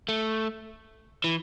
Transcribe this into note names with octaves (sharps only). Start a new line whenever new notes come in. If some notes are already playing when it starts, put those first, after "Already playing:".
A3
E3